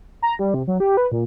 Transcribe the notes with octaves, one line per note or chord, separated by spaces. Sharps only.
A#5
G3
C3
F#3
G4
B4
A#2